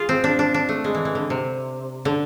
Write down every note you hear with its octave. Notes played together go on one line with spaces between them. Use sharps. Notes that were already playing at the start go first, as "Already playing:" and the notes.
Already playing: F4 G#4
C4
D4
D4
D4
A3
G#3
E3
E3
D3
C3
D3